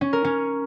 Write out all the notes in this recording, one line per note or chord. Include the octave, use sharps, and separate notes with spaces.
C#4
A#4
C#4